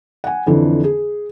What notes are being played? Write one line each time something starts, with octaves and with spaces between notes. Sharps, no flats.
F#5 G#5
F2 D3 E3
G#4